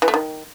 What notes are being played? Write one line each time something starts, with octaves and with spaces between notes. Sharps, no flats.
E3
A3
D#3